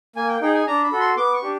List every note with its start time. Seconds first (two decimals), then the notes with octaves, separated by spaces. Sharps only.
0.16 A#3 G#5
0.29 G5
0.41 D#4 G#4 G5
0.54 G#5
0.67 D4 A#5
0.84 B5
0.92 F#4 A4
1.00 C6
1.17 B3 D6
1.34 C#6
1.42 D4 G4